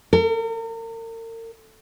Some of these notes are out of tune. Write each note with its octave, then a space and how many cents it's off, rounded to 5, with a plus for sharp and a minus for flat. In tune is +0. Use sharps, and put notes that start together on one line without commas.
A#4 -40